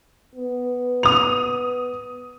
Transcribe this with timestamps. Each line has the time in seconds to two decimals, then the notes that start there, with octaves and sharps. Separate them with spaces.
0.35 B3
1.03 D#6 F7